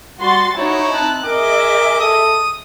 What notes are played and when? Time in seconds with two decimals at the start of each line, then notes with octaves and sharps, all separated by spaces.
0.19 G3 F#4 C6 A6
0.57 D#4 E4 F#4 C#5
0.94 C4 A5 F#6
1.25 G#4 A#4 D#5 E5 D6
2.00 A4 D#6